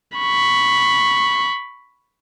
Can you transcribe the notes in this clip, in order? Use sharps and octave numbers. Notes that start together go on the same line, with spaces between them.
B5 C#6